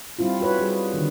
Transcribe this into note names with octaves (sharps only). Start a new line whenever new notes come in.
G3 C4 E4 F4
F4 F#4 B4 C#5
G3 G#4
D3 D#3